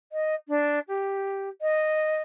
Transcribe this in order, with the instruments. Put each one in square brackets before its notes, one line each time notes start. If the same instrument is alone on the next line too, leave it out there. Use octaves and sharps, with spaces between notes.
[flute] D#5
D4
G4
D#5